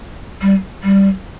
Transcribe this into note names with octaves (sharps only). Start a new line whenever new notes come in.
G3
G3